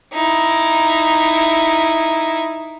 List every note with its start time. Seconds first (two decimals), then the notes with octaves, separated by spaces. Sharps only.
0.14 D#4 E4